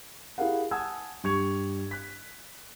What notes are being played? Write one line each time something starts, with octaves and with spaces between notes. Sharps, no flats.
E4 G4 G#4 A#4 F5 F#5
F#5 G#5 A5 D#6 E6 G#6
G2 G4 C#6 G#6 C#7 F7
F#6 B6